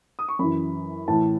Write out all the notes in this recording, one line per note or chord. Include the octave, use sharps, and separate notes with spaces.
D#6
C#6
F#2 E3 B5
A2 E3 A5